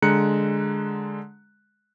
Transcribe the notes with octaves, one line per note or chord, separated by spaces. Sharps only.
D3 G#3 A#5 F#6 C#7